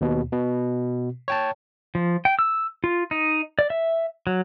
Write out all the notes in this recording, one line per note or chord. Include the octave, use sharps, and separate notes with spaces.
D#2 B2
B2
C#5 G5 A5
F3
G5
E6
F4
D#4
D5
E5
F#3